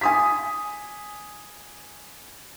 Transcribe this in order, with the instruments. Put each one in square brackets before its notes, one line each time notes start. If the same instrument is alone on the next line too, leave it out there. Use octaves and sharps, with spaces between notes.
[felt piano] G#5 D#6 B6